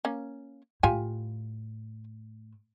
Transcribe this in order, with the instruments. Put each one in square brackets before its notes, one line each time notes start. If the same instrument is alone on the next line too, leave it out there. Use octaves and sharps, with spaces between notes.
[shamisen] A#3 C#4
[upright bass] A2 [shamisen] F4 G4 G#5